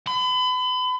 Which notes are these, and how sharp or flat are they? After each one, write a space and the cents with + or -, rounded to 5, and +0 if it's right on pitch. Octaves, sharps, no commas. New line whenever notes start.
B5 +35